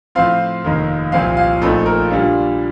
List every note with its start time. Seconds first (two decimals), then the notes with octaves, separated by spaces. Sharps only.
0.15 A2 F3 C4 F4 F5
0.64 F1 D#2 D#3
1.12 C2 A#2 F3 C4 F5
1.37 F5
1.61 A#1 A#2 A3 C4 D#4 A4
1.86 A#4
2.10 A#2 G3 D4 F4